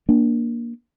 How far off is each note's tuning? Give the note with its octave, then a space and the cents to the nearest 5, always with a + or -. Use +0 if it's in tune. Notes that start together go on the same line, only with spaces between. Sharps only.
A#3 +10 D4 +0